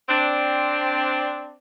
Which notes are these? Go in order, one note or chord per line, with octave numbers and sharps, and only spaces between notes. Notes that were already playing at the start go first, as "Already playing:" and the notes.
C4 D4